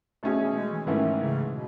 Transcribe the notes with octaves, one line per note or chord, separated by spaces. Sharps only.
B2 A3 C#4 G#4
E3
G#3
E3
G#2 D#3 E3 A3 C#4 E4
C#3
B2